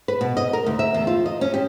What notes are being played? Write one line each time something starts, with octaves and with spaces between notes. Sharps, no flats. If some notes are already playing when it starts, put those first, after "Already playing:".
B4
B2
D#5
A#4
D2
E5
E2
F4
D#5
C#4
G4